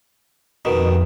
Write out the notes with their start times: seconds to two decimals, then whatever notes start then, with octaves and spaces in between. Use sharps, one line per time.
0.65 F2 B2 D#3